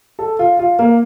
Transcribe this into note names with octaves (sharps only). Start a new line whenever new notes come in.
A4
F4
F4
A#3